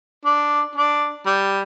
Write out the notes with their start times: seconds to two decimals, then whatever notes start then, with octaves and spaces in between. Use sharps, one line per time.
0.25 D4
0.75 D4
1.26 G3